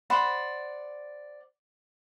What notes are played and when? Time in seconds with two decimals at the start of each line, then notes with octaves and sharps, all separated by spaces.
0.10 C5 D5 F#5 B5